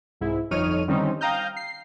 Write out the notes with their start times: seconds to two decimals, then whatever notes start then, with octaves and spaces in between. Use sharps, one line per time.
0.21 C2 G#2 E4
0.51 G1 F2 D#4 C#5 F6 D#7
0.88 D3 D#3 G3 C4 C#4 D#4
1.21 F5 G5 A#5 D#6 F6 G6
1.56 C7